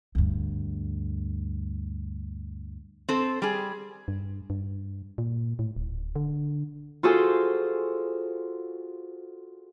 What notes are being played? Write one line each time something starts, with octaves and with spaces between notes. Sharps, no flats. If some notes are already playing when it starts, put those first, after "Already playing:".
D2 G2
C4 A4 C5
G3 G#4
G2
G2
A#2
A2
D1
D3
F4 F#4 G#4 A4 C5